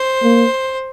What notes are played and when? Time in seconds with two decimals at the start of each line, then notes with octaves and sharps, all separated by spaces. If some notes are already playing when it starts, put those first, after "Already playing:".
Already playing: C5
0.23 A#3